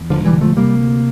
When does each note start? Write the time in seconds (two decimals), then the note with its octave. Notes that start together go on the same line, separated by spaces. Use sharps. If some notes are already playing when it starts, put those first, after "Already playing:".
Already playing: E2
0.10 E1 D3 F3
0.25 E3 G3
0.33 D3
0.41 F3 A3
0.56 C3 G3 A#3
0.80 D2